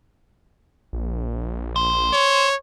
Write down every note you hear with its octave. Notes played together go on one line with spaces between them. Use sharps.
A#1
C5
C#5